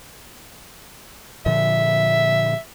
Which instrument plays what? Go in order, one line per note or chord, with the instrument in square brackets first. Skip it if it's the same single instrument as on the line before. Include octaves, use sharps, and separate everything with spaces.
[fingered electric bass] A#2 D3 F3 [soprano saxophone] E5